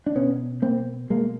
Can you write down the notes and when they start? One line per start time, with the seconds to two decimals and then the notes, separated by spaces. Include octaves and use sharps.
0.06 D4
0.16 B2 B3 C#4
0.62 B2 A#3 C4
1.10 B2 G#3 A#3